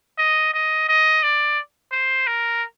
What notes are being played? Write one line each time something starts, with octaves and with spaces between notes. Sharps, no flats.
D#5
D#5
D#5
D5
C5
A#4